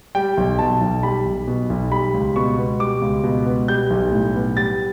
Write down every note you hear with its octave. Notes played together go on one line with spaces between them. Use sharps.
G3 G5
B1
B2 A5
B1
G3 B5
B1
B2
B1
G3 B5
C#2
B2 C#6
B3
G3 D6
C#2
B2
B3
G3 G6
B1
A2
B3
G3 A6